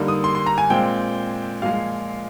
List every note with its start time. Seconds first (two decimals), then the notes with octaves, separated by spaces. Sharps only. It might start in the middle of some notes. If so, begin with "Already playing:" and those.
Already playing: D3 G3 A#3 D#4
0.08 D#6
0.24 C6
0.35 C6
0.46 A#5
0.58 G#5
0.70 A#2 G#3 C4 G5
1.62 A#2 F3 G#3 F5